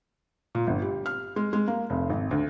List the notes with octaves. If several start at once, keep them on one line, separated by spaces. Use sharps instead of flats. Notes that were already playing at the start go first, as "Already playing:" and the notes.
A#2
G1
G3
F6
G#3
G#3
A#3
F1
G#1
D2